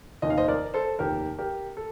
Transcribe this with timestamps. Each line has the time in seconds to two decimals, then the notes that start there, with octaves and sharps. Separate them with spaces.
0.22 F1 D#2 D#3 D#5
0.30 F5
0.38 C5 D#5
0.48 A#4 D5
0.74 A4 C5
0.99 F1 D#2 D#3 G4 A#4
1.38 G4 A#4
1.77 A4